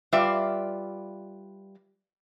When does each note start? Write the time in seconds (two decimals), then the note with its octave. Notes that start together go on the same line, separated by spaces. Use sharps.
0.13 G3 F4 B4 D5 E5